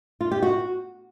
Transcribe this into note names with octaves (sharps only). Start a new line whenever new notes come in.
F4
G4
F#4